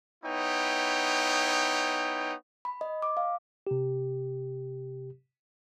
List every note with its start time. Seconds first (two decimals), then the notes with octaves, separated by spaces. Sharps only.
0.24 B3 D#4 E4 C#5 G5
2.65 B5
2.81 D#5
3.02 D6
3.17 F5
3.67 C3 G4